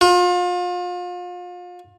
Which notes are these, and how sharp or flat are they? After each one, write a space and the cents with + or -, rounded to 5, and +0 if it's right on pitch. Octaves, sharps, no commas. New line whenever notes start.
F4 +35